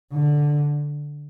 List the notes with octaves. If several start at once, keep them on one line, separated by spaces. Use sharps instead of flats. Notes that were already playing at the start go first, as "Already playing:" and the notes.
D3